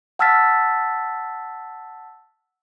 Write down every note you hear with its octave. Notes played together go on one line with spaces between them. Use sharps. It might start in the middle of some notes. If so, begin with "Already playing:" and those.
F#5 A5 E6 F6 A6 B6